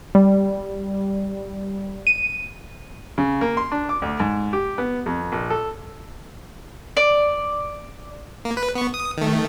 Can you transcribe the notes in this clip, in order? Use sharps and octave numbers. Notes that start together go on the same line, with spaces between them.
G3
D#7
C#3
A#3
C6
D4
D6
D2
G#2
G4
B3
F2
A#1
A4
D5
A#3
B4
B3 C#6
D#6
D#3 A3